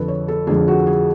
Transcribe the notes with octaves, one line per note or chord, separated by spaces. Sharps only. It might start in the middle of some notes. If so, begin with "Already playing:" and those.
Already playing: F2 D3 F3 A4 B4
C#5
A4
F2 D3 F3 G#4
F#4
G#4